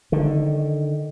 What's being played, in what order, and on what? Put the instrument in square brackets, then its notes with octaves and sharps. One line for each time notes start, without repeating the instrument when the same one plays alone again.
[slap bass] D3 D#3